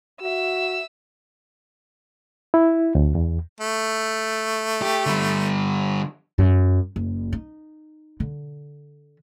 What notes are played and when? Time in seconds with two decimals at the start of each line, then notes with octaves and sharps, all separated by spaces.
0.22 F#4 E5 E6
2.54 E4
2.95 D2
3.15 E2
3.61 A3
4.82 G4
5.06 D3 G3
6.38 F#2
6.96 F#1
7.33 D#4
8.20 D3